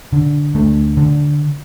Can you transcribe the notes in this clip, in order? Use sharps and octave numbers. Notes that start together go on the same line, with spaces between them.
D3
D2 A3
D3